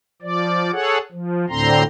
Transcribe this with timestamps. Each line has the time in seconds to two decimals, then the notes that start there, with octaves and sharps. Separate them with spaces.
0.22 F3 D5
0.72 G#4 A4 C#5 F#5
1.12 F3
1.49 D2 A2 D3 C4 A#5 C6